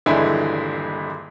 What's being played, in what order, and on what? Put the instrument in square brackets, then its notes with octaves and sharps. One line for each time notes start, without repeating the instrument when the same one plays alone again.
[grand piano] D#1 G2 D3 E3 G#3 E4